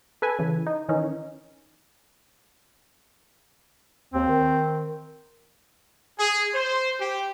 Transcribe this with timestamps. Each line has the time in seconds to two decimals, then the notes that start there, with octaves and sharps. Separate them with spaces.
0.22 A4 B4 G#5
0.39 C#3 E3
0.67 D#4
0.89 D#3 E3 C#4 D#4
4.14 D#2 C4
4.28 D#3
6.19 G#4
6.53 C5
7.00 G4